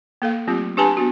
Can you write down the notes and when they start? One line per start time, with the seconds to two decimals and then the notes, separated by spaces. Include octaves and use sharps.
0.22 A#3 A4 F5
0.47 F#3 A3 C4 F4 G4
0.77 D4 G4 B4 G#5 A5 B5
0.97 B3 D4 F#4